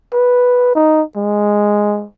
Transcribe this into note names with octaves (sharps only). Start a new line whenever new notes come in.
B4
D#4
G#3